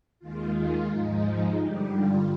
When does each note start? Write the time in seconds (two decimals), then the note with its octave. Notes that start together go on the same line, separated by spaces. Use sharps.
0.19 D#2 D#3 G#3 F4
0.55 F4
0.89 G#2 F3 G#3 D#4
1.24 D#4
1.59 G2 D3 G3 G4
1.94 F4